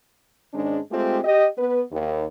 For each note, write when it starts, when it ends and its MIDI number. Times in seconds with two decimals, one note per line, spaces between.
0.53 0.78 44
0.53 0.78 51
0.53 0.78 56
0.53 0.78 61
0.53 0.78 62
0.91 1.18 56
0.91 1.18 57
0.91 1.18 60
0.91 1.18 65
0.91 1.18 67
1.24 1.46 67
1.24 1.46 75
1.57 1.81 59
1.57 1.81 71
1.91 2.24 39